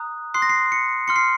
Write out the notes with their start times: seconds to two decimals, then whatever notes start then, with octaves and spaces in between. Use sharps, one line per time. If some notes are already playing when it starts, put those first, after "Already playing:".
Already playing: A#5 D#6 F#6
0.34 C6 D#6 F#6 C7
0.42 A#6
0.50 C7
0.72 C#7
1.08 C6 F6 C#7
1.16 C7